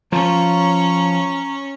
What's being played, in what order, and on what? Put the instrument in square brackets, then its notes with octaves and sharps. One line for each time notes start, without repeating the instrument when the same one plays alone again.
[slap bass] F3 [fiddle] C#4 C#5 [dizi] A#5